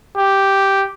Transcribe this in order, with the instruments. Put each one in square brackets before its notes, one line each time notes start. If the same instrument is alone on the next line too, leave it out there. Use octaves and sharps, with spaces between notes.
[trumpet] G4